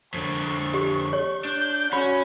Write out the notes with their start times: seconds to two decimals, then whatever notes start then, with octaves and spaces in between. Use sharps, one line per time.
0.14 F2 D3 C#6
0.74 G4
1.13 C#5
1.45 D4 G6
1.93 C#4 F#4 B5